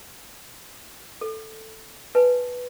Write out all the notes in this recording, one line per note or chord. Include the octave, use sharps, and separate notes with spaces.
A4
B4 G#5 A5